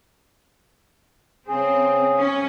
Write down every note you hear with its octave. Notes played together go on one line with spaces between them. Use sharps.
C#3 C4 G#4
C#4